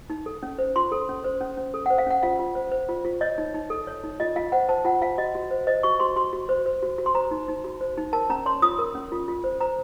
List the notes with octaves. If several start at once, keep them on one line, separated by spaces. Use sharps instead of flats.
D#4
A4
C#4
C5
F4 C6
A4
C#4
C5
C#4
C#4
A4
C5 F#5
F5
C#4 F#5
F4 F5
F4
C5
C5
F4
F4
C#5 D#5
D#4
D#4
A4
C#5
D#4
F4 D#5
F4 F5
C5 F#5
C5 A5
F4 F#5
F4 F5
F#4 D#5
F#4
C5
C5 D#5
F#4 C#6
F#4 C6
F#4 C6
F#4
C5
C5
F#4
F#4
C6
C5 A#5
D#4
D#4
F#4
C5
D#4
A#4 A5
C#4 A#5
C#5 C6
F4 D#6
A#4
C#4
F4
F4
C5
C5 A#5